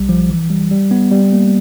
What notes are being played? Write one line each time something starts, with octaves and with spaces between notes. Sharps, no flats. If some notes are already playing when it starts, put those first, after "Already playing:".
Already playing: B1 G3
F3
E3
G3
G3
B3
G3
A#3